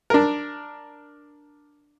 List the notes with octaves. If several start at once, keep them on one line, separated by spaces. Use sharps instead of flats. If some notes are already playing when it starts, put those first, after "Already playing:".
D4 A#4